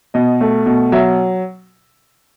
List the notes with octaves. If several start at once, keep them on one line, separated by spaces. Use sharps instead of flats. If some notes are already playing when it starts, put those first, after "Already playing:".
B2 D#5
A3
B2
F#3 E5